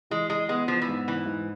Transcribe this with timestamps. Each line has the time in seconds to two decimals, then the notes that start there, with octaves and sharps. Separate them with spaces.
0.11 E3 G#3
0.30 G#3
0.49 G#3 B3
0.68 F3
0.82 E3
0.88 G#2
1.08 E3
1.26 G#2